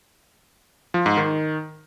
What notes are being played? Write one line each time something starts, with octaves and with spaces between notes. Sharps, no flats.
F3
G#2
D#3